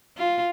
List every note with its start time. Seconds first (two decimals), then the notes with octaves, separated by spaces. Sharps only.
0.17 F4